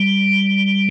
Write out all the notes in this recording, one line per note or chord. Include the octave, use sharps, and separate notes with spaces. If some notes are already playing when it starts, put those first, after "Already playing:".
Already playing: G3